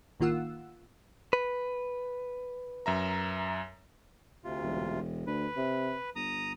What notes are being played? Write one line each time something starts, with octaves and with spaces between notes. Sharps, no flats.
A1 D#3 A#3 F4 F#5 E6
B4
F#2 E5 A#5
D2 C3 F4
E1
D2 B4
C3
G1 A#5 D#6